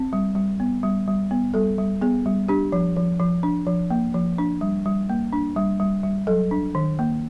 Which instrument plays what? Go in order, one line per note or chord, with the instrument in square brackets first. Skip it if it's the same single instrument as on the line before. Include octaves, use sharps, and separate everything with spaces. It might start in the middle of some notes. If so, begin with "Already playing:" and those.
Already playing: [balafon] C4
G3
G3
B3
G3
G3
B3
G3 A4
G3
B3 G#4
G3
D4 G4
F3
F3
F3
D4
F3
A#3
F3
D4
G3
G3
A#3
D4
G3
G3
G3
F#3 A4
D4
D#3
A#3